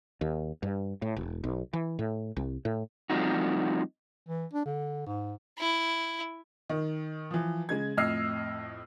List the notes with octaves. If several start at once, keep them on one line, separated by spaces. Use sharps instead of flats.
D#2
G2
A2
E1
B1
E3
A2
C2
A2
F3 G3 A3 C4 D#4 F#4
E3
D4
D3
G#2
E4
D#3
E3 F3
C#3 G#3 G#6
F2 A2 D#5 E6 F6 C7